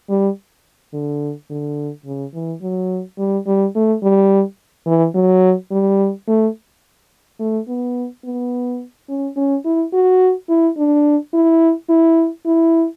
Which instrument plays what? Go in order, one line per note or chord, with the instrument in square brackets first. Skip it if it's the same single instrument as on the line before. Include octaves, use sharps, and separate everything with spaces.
[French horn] G3
D3
D3
C#3
E3
F#3
G3
G3
A3
G3
E3
F#3
G3
A3
A3
B3
B3
C#4
C#4
E4
F#4
E4
D4
E4
E4
E4